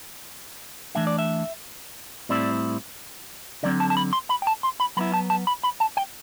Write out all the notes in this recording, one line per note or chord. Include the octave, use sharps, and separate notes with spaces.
E3 A3 D4 E5
D5
E5
A2 G3 C4 E4 D5
D3 F#3 C4 D5
A5
A5
B5
C6
B5
G5
A5
C6
B5
F#3 B3 E4 B5
A5
A5
B5
B5
A5
G5